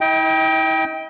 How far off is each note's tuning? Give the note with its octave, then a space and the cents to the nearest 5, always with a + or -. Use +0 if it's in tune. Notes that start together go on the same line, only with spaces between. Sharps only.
E4 -40 D#5 +40 G5 +0